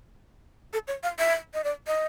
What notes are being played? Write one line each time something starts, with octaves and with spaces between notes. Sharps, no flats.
A4
C#5
F5
E5
D#5
D5
D#5